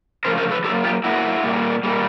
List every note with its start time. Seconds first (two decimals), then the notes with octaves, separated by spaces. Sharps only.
0.25 C#3 F3 A3 A#4 C5
0.38 A#4 C5
0.51 A4 B4
0.64 A2 F#3 A#3 G4 A4
0.84 F4 G4
1.04 A2 F#3 A#3 E4 F#4
1.44 A#2 G3 A#3
1.83 A#2 G3 A#3